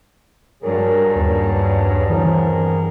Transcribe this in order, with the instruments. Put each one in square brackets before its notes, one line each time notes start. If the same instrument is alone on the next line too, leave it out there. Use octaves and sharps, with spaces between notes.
[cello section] G2 [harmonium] F#3 G#4 [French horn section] A#4
[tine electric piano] D#2 [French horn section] B4
[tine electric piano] E3 [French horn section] B3 C4 C5 [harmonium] G#4 A#4